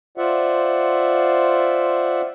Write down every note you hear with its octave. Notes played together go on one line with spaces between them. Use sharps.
F4 C5 D5 E5 F#5